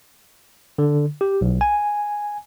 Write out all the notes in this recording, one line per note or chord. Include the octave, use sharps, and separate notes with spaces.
D3
G4
B1
G#5